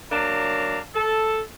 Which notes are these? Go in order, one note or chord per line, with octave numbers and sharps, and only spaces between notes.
F#3 A#3 D4 A#5
A4